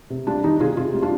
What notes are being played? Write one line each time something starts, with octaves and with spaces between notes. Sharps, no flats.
C3
G3 D4 F4
D#3 D#4 G4
C3 F4 G#4
C3 F4 G#4
G3
D4 F4